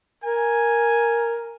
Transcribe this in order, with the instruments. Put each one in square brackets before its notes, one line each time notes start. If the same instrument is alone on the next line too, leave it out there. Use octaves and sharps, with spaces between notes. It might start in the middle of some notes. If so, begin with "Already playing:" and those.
[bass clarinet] A#4 [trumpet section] G#5